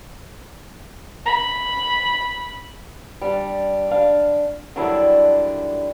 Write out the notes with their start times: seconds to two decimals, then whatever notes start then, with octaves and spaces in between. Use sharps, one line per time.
1.25 B5
3.22 G3 D4
3.91 D4 F5
4.76 D3 D#3 F#3 G3 D4 E4